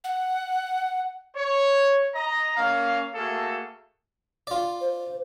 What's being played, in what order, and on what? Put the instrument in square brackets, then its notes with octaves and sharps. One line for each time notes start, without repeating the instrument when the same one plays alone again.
[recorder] F#5
[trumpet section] C#5
D#5 A#5
A#3 C#4 F5
A3 A#3 F#4 G#4 A4
[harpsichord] F4 D5
[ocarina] C5